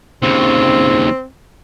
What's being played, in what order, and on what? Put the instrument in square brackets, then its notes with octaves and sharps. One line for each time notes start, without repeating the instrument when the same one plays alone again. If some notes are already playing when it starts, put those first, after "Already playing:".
[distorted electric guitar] D#2 C#3 [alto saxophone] C4